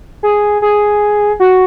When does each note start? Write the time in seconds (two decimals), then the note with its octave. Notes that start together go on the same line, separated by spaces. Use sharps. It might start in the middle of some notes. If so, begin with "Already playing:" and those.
0.23 G#4
0.62 G#4
1.40 F#4